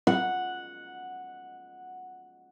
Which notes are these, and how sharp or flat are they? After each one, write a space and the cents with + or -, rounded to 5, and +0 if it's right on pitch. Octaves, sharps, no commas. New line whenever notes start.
F#5 -5